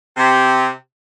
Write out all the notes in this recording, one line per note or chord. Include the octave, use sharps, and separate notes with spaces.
C3